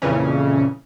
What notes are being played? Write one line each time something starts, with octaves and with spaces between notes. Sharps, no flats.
F2 A#2 C#3 E3 C#4